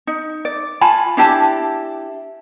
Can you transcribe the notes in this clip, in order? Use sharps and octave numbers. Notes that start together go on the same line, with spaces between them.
D#4
D5
F4 G#5 A5 B5
D4 E4 G4 A5